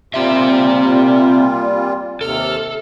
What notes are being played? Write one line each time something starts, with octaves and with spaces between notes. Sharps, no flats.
A#2 G3 C4 F4 G4 E5
D#2 C3 A4 F6